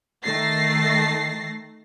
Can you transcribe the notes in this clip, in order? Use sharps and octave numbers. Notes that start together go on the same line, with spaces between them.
D#3 A3 A6 A#6 C7